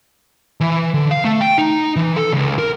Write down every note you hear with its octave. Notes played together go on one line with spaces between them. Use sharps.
E3
D3
F5
A3
G5
D#4
E3
A4
C#2
A#4